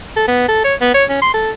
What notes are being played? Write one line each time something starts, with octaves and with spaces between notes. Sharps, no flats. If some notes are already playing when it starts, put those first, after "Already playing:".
A4
B3
A4
C#5
B3
C#5
C#4
C6
A4